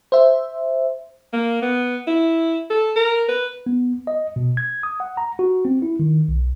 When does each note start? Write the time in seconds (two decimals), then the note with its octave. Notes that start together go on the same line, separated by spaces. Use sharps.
0.12 C5 E5
1.33 A#3
1.62 B3
2.07 E4
2.70 A4
2.96 A#4
3.29 B4
3.66 B3
4.07 D#5
4.36 B2
4.57 G#6
4.83 D#6
5.00 F#5
5.17 A#5
5.39 F#4
5.65 C4
5.82 E4
5.99 D#3
6.28 B1